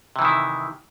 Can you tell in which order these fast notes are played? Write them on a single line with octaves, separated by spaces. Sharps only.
C3 E3 D#3 E4